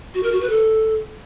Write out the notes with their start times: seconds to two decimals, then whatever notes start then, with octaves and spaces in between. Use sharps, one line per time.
0.14 F#4
0.23 A#4
0.32 F#4
0.41 B4
0.49 A4